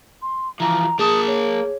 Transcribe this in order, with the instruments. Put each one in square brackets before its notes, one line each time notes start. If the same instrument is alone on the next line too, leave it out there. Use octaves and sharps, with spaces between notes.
[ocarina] C6
[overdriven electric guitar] E3 F3 [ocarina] A#5
[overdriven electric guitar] A#3 A5 [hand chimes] G#4 [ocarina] D#6
[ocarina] C#5